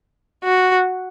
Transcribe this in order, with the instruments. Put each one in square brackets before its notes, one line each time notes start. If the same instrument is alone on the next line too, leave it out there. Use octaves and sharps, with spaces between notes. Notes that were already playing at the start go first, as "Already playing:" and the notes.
[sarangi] F#4